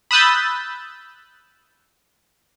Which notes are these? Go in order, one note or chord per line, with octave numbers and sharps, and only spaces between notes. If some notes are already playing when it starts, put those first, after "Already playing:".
B5 D#6 E6 F#6 G6 A6